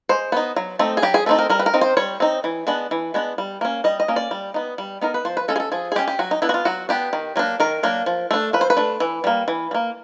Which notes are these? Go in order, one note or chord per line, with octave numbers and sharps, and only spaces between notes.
G#3 C5
B3 D#4
F#3
A3 C4 D#4
G#4
F#3 G4
G#4
A3 C4 D#4 A4
A#4
G3 A#4
B4
A#4
C4 D#4
C5
G3 C#5
C4 D#4
E3
G#3 B3 D4
E3
G#3 B3 D4
G3
A#3 C#4
G3 D#5
D#5
A#3 C#4
D5
G3
B3 D#4
G3
B3 D#4 A#4
B4
F3 C5
B4
G#3 C#4 A4
G#4
A4
F3 G#4
G#4
G#3 C#4 G4
G4
F#3 F#4
D#4
B3 D4 E4
F#4
F4
F#3 F#4
B3 D4 G4
D#3
F#3 A#3 D4
D#3 A#4
F#3 A#3 D4
F3
A3 D4
F3 B4
C5
B4
A3 D4
E3
G3 A#3
E3
G3
A#3